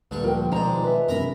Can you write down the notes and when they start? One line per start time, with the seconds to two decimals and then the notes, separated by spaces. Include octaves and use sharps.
0.11 D2 G2 A#2 D3 C#6
0.24 F3 A#4 G5
0.52 B2 D#3 G#3 D4 D#4 C5 A#5
0.84 B4 E5
1.09 E1 F#2 C3 A#4 A#5 B5